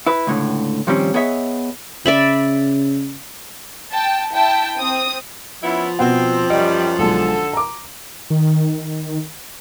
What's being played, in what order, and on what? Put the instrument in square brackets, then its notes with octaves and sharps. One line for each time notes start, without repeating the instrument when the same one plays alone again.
[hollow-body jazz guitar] E4 B4
C#2 A2 D3
A#2 D#3 F3 G3 C4 C#4
B3 G#4 C#5 D#5 E5
[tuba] C#3 [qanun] D5 E5 B5
[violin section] G5 A5
E4 G5 A5
C4 D#6
[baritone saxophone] F3 [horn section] B3 C#4 E4
[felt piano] B2 B3 F#5 [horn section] C4
[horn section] F#2 G3 [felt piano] D#5
[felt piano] B1 G#3 [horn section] D3 A4
[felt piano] A#5 D6
[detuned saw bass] D#3